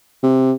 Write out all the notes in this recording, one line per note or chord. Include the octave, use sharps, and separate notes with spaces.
C3